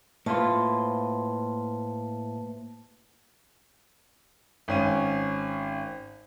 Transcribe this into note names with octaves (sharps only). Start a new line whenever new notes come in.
A2 A#3 F4 B4 C5 A5
G#1 C#4 D#7